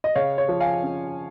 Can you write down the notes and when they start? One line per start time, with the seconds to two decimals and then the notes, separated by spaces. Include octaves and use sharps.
0.04 D#5
0.15 C#3 C#5 F5
0.38 C#5
0.48 F3
0.60 F5 G#5
0.83 C#4